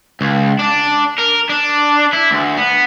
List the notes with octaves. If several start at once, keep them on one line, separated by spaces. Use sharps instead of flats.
C#2
D4
A#4
D4
E4
D2
B3